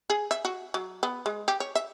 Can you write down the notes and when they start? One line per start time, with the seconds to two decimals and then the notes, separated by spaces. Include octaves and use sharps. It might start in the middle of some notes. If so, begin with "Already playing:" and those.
0.10 G#4
0.31 E5
0.45 F#4
0.74 F#3
1.03 B3
1.26 G#3
1.48 G4
1.60 C#5
1.75 E5